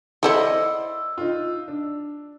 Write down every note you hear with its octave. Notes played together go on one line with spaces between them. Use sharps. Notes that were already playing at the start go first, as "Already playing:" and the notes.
E4 A4 C5 D5 D#5 F#5 C6 E6
D#4 F4
D4